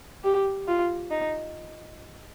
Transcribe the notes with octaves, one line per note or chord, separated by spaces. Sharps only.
G4
F4
D#4